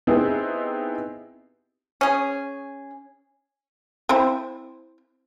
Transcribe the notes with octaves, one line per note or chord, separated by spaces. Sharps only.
B3 C4 D#4 E4 G4 G#4
C#4 G#4
C4 E4 C5